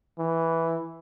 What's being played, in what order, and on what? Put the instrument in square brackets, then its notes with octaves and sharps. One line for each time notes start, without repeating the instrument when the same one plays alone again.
[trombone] E3